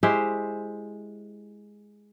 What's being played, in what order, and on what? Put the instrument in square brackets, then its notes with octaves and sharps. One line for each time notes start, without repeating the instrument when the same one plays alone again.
[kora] G#3 E4 G4 C5